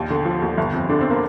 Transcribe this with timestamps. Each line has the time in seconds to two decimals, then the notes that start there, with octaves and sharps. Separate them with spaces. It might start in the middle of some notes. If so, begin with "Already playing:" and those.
Already playing: A#1 D#2
0.10 D3
0.25 F3
0.42 D#2
0.58 G1
0.74 F2
0.89 D3 D4
1.01 C4
1.10 A#3